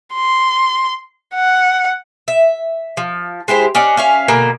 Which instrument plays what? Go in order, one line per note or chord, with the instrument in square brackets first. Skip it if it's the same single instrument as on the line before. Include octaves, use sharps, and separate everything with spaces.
[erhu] C6
F#5
[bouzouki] E5
F3
G#3 E4 G4 C5
C#4 D4 D#5 F#5
C#4 E5 F5
B2 D3 A#3 G#5